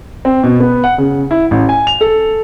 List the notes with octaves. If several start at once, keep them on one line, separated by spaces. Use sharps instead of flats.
C4
B2
B3
F#5
C#3
E4
A1
G#5
F7
A4